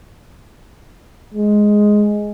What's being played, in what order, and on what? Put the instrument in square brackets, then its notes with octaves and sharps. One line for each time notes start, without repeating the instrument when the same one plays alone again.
[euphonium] G#3